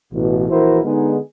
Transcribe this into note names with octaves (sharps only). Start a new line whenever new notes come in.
A1 B2
A#1 E3 E4 F#4 A#4 C5
D3 G#3 B3 D#4 G#4